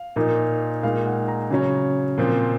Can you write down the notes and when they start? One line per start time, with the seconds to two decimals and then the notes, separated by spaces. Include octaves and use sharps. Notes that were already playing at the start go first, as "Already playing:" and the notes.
Already playing: F5
0.16 A#2 F3 A#3 D#4
0.83 A#2 G#3 D#4 F5
1.06 F#5
1.28 A#5
1.51 C#3 F#3 C#4
2.18 A#2 F3 C4